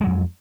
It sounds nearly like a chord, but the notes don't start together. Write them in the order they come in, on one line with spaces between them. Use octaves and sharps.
G#3 F#3 F2